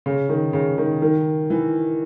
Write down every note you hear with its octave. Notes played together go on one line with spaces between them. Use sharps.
C#3
D#3
C#3
D#3
D#3
E3